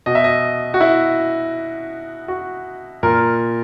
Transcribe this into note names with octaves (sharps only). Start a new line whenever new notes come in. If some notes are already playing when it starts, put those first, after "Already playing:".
B2 D#5
E5
D#5
F#4
E4
F#4
A#2 A#4